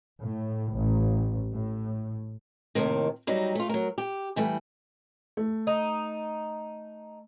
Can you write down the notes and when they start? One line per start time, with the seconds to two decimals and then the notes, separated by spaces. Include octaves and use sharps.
0.20 A2
0.74 A1
1.53 A2
2.75 D#2 A2 C3 D#3
3.27 F#3 G3 D#4
3.55 A3 F4
3.69 F#3 A#4
3.98 G4
4.36 E3 G3 A3
5.37 A3
5.67 D#4